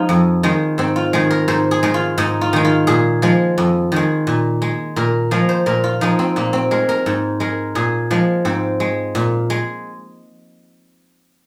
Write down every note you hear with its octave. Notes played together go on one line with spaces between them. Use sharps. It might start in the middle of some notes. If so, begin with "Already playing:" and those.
Already playing: F3 G#3 D#4 F4
F2
D#3 G#3
G#2 C4
F4
D#3 G#3
A#4
G#2 C5
G#4
D#3 G#3
F4
G#2 D#4
F4
D#3 G#3
F4
A#2 G#4
F3 G#3
F2
D#3 G#3
A#2
G#3
A#2 A#4
F3 G#3 A#4
C5
A#2 A#4
F4
F3 G#3 D#4
C4
A#2 A#3
C4
G#3 A#4
A#4
G#2
G#3 A#4
A#2 G#4
F3 G#3
G#2 C4
G#3
A#2
G#3